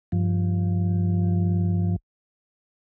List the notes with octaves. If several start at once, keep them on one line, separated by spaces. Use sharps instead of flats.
G2 F3